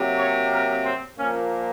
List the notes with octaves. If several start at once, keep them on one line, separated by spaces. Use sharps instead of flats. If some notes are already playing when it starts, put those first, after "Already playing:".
Already playing: C3 F#3 A#3
C#5
A#4
C4
A#2 F3 A#3 C#4